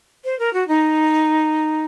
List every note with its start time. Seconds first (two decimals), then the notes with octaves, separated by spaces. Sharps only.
0.24 C5
0.39 A#4
0.53 F#4
0.68 D#4